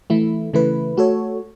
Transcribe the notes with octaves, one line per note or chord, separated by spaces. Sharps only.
E3 A3 E4
C#3 E3 A3 E4 B4
A3 F#4 A4 C#5